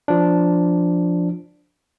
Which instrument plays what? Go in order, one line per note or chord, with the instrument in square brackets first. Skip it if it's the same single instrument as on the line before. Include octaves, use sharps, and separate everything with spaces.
[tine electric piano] F3 D4